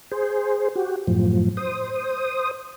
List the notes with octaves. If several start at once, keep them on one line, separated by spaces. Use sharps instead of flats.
G#4 C5
F#4 G4
F#2 A2 F3
C5 D#6